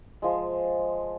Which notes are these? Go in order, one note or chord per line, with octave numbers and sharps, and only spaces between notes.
F3 G#3